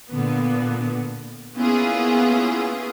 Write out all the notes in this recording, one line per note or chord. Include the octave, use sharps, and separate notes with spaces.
A#2 D3 B3
A#3 B3 C#4 E4 F4 G#4